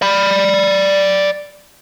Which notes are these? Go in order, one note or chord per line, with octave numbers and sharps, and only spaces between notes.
D5 B5